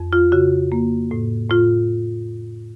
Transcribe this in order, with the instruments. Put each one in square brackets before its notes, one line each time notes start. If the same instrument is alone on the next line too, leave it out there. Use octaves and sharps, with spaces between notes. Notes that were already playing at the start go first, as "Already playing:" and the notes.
Already playing: [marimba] F2
F4
C#3 F#4
A#3
A2
A2 F4